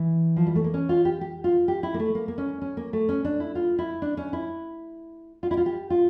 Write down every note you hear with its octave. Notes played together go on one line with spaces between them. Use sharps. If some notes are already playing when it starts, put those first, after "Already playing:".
Already playing: E3
F3
G3
A3
A#3
C#4
F4
G4
G4
F4
G4
E4
A#3
A3
A#3
A#3
C#4
C#4
A#3
A3
C#4
D4
E4
F4
E4
D4
C#4
E4
F4
E4
F4
G4
F4